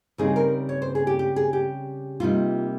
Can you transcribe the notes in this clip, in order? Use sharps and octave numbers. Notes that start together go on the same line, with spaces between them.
C#3 G3 C4 D#4 G#4
A#4
C#5
C5
G#4
G4
G4
G#4
G4
C3 G3 A#3 D#4 F4